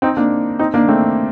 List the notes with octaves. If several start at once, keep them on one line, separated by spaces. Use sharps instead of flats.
C4 D#4
A#3 D4
C4 D#4
A#3 D4
A3 C4